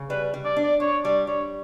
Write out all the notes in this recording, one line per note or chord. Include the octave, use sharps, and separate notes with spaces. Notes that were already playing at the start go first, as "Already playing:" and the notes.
Already playing: C#3
G3 B4
G3
D5
D4
D5
D4 C#5
G3 D5
G3 C#5